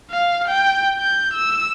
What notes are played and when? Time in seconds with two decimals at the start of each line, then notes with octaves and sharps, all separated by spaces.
0.11 F5
0.48 G5
0.99 G6
1.34 E6